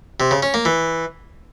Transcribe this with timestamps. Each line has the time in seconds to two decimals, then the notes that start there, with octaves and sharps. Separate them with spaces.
0.20 C3
0.31 C#3
0.43 C#4
0.54 A#3
0.65 E3